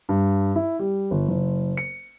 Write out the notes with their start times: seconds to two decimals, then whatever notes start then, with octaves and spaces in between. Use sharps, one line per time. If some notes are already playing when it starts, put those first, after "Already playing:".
0.09 G2
0.56 E4
0.79 G3
1.11 G1
1.28 F#1
1.77 C#7